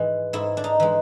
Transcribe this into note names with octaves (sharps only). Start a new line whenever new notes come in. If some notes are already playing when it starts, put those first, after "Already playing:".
Already playing: G#2 E3 G#3
G#2 E4
D4
D#4
E3 G#3